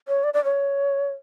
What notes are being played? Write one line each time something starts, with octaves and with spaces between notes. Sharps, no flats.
C#5
D5
D5
C#5